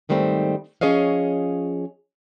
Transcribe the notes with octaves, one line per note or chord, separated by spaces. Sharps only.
G#2 D#3 G3 A3 C4
F3 C#4 G#4 C#5 D#5 F5